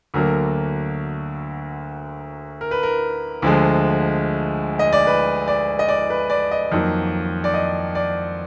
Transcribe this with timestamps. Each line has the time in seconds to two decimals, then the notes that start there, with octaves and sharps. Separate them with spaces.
0.14 D2 D3 F#3 A#3 A#4
2.61 A#4
2.71 B4
2.83 A#4
3.42 D2 D3 F3 G#3
4.79 D#5
4.93 D5
5.07 B4
5.48 D5
5.79 D#5
5.89 D5
6.10 B4
6.30 D5
6.51 D#5
6.72 F2 D#3 F#3 A#3
7.44 D5
7.54 D#5
7.95 D5